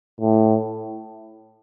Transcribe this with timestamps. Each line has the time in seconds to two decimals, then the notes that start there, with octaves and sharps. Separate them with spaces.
0.21 A2